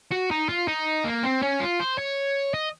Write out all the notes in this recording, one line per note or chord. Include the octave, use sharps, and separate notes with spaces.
F#4
D#4
F4
D#4
A#3
C4
C#4
F4
C5
C#5
D#5